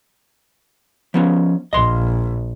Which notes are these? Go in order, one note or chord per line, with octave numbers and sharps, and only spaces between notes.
F3 B3 C#4
A#1 D#5 C6